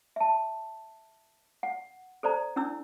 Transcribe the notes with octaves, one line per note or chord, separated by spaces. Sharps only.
E5 A5
F#5
A4 C5 D5 A#5
C#4 D4 E4 E6